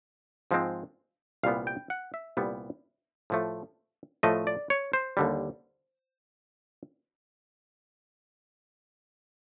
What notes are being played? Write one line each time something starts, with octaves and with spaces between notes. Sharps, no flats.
G#2 F3 G#3 C4
C2 A#2 G3 B3 F5
G5
F#5
E5
C2 A#2 G3 B3
A2 F3 A3
A2 F3 A3 D#5
D5
C#5
C5
D#2 D3 G3